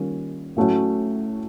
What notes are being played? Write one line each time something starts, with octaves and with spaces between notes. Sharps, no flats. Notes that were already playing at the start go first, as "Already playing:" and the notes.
Already playing: D#3 G3 A#3 C#4 F4
A2 F#3 A3 C#4 F#4